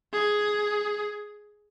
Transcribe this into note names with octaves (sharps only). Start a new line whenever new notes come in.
G#4